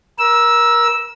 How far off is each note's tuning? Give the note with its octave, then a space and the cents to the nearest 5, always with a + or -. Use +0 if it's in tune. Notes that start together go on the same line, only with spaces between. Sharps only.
A#4 +25 E6 -5